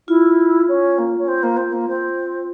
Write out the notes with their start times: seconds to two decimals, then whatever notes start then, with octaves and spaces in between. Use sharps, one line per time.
0.07 E4 F4
0.68 C#4
0.98 A#3
1.18 C#4
1.27 C4
1.42 A#3
1.56 C4
1.72 A#3
1.87 C4